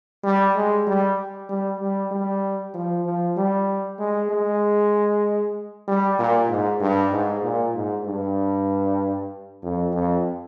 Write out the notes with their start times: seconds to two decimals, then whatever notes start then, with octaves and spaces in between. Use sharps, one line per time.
0.24 G3
0.56 G#3
0.87 G3
1.49 G3
1.81 G3
2.11 G3
2.74 F3
3.06 F3
3.37 G3
3.99 G#3
4.30 G#3
5.88 G3
6.19 A#2
6.49 G#2
6.80 G2
7.12 G#2
7.43 A#2
7.75 G#2
8.06 G2
9.63 F2
9.93 F2